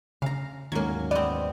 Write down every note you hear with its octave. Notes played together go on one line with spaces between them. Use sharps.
C#3 F5 A#5
D#2 G#2 F#3 A#3 C#4 G#6
B3 C4 D5